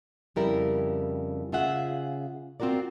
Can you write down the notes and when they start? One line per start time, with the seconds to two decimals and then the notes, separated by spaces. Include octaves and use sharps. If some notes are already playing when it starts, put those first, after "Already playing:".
0.36 F2 C#3 G3 E4 A#4
1.52 C#3 F4 G#4 E5 F#5
2.60 C4 F4 F#4 A#4 D5